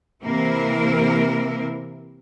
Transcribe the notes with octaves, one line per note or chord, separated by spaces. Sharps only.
C3 E3 A#3 E4 A#4